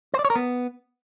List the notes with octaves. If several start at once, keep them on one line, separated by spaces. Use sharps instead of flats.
C5
D5
C#5
A#4
B3